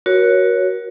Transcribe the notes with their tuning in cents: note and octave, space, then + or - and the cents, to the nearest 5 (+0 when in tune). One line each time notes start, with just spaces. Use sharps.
F#4 +0 A#4 +30 C#5 +0